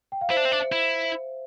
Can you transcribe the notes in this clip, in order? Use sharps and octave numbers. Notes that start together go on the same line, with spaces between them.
G5
F5
E4 C5 E5
D4
C4
D4
E4